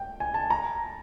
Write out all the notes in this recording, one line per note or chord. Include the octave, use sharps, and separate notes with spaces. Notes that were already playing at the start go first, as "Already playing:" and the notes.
Already playing: G5
G#5
A5
A#5